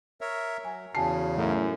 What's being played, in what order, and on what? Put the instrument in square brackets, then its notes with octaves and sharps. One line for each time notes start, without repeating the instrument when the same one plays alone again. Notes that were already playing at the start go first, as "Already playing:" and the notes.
[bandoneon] A#4 C#5 E5
[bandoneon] F#3 [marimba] G#5
[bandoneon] E2 C#3 [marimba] F#4 G#5 A5 [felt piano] C7
[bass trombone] F#2 [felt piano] A2